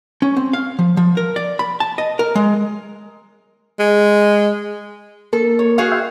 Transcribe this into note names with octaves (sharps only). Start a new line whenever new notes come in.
C#4
C4
F5
F3
F3
A#4
D5
B5
A5
D#5
A#4
G#3
G#3
A#3 A4 A#4
C#5
F#4 G#4 F5
E5 G5 C6